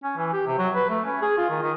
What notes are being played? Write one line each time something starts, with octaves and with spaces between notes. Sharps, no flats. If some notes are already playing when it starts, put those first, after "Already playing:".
C#4
E3
G4
C3
F#3
B4
A3
C#4
G#4
F4
D#3
D#3